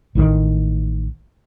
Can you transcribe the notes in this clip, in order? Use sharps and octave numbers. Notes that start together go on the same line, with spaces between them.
A1 A2 C3 D#3